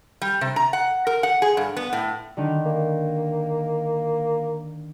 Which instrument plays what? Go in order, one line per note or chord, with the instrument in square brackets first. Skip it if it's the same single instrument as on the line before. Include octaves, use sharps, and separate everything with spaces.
[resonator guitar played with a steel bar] G3
C3
A#5
F#5
A#4
F#5
G#4
G2
B3
A2
[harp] D3 D#3
[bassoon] A#3